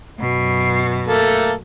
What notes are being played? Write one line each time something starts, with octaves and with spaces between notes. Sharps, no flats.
F#2 B2
A3 A#3 A4